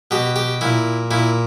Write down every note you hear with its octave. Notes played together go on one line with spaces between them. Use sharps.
B2 G4
G4
A#2 E4
A#2 E4